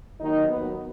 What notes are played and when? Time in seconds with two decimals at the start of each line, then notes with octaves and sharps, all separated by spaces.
0.20 D#2 D#3 F#3 D#4
0.49 D#2 D#3 F#3 B3